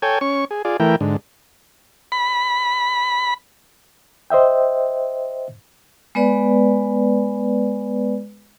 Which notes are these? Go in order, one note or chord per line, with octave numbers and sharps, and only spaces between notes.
A4 C#5 G5 G#5
C#4 C#6
G#4
F4 G#4 D5
E3 A3 E4 A#4 G5
G#2 D3
B5
C5 D#5 E5 G5
G#3 B3 B4 D5